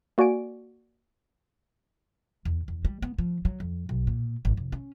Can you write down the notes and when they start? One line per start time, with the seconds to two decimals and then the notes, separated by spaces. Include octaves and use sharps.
0.18 A#3 F#4 D5 G#5 D7
2.45 E2
2.68 E2
2.85 G3
3.02 B3
3.18 F3
3.45 F#3
3.60 F2
3.89 B1
4.07 A#2
4.45 G#1
4.57 F1
4.72 C#4